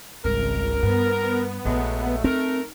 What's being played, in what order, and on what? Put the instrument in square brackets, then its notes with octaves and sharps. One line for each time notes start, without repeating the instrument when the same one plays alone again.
[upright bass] G#1 G3 [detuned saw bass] C#2 [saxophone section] A#4
[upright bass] G2 [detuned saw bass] B3
[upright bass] A#1 [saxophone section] F#3 G#3 A3
[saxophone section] A3 A#4 [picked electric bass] C4 [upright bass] D#4